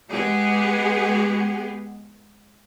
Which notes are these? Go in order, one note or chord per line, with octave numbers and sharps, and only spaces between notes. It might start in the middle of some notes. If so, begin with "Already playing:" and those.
G#3 B3 G4 G#4